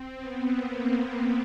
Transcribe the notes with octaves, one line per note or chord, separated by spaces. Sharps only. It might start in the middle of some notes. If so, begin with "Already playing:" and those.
Already playing: C4
B3
A#3